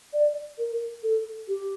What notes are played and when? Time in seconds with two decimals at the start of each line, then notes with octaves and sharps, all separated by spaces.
0.13 D5
0.58 A#4
1.03 A4
1.48 G4